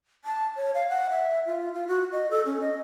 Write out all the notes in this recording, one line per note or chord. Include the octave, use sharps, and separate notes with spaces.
A5
C#5
F5
F#5
E5
F4
F4
F#4
D#5
A4
C#4
D#5